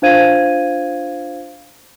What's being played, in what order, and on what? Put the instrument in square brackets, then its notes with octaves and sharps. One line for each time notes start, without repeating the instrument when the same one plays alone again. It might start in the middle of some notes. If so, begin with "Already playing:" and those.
[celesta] D4 F4 C5 F5 G#6 D#7